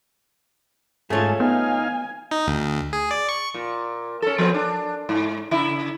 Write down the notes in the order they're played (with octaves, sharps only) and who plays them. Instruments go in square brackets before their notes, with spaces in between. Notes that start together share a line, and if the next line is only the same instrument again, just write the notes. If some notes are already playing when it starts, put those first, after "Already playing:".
[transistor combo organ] G#2 G#4 [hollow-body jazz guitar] A3 C#4 F4 [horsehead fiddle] A5
[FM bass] B3 [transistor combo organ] D#4 F5 [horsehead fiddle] G#5
[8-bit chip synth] D#4
D2
G#4
D5
C#6
[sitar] A#2
C#4 A4
F3 B3 C4
D4
G#2
C#3 E4